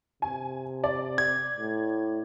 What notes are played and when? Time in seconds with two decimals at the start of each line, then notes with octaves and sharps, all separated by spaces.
0.22 C3 G#5
0.84 D5
1.18 G#6
1.57 A2